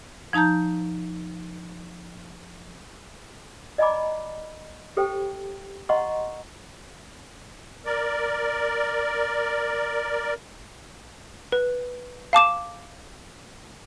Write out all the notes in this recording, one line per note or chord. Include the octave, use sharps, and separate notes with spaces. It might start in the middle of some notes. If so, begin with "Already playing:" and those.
F3 D#4 A5 A#5 G6
D5 D#5 G#5 A#5 B5 D6
G4 A4 C5 G5
D#5 F#5 A#5 C6 C#6
A#4 D5
B4
F5 A5 D6 E7